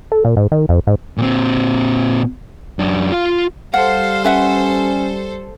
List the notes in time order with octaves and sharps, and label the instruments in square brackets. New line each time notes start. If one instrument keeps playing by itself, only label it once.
[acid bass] A4
A#2
G#2
D#3
F2
G#2
[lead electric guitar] A#2 C4
F#2 D4
F4 F5
[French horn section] G3 [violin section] A4 C5 [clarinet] F5 [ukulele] F#5
[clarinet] C#4 [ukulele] B4 E5 F#5